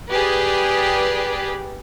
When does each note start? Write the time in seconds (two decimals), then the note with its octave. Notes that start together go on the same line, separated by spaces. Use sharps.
0.11 G4 G#4 B4 D5